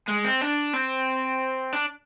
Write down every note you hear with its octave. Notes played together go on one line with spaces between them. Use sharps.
G#3
C4
D4
C4
D4